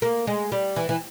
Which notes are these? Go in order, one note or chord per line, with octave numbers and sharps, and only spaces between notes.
A#3
G#3
G3
E3
E3